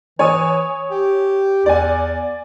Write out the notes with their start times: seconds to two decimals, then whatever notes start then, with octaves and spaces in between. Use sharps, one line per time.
0.19 E3 C#5 G#5 D#6
0.91 G4
1.66 E2 D5 G#5